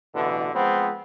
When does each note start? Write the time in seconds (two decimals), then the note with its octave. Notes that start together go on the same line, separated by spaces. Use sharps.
0.14 A1 B2 D3 E3
0.54 F3 G#3 B3 C4